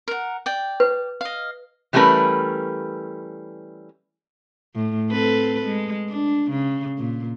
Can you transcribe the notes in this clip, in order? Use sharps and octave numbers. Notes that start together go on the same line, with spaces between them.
A#4 F#5
D5 G5
B4
D#5 F5
E3 G3 A3 C#4 A#4 B4
A2
C4 A4 B4
G#3
D4
C#3
A#2